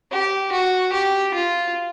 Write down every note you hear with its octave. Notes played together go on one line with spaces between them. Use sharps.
G4
F#4
G4
F4